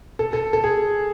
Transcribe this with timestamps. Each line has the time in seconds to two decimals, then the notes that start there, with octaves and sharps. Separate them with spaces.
0.19 A4
0.33 A4
0.53 A4
0.64 G#4